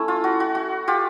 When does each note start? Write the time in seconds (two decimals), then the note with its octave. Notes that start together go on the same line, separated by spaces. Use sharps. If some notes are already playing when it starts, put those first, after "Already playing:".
Already playing: A3 C#4 E4
0.08 F4
0.24 F#4
0.40 F#4
0.55 F#4
0.88 F4 G4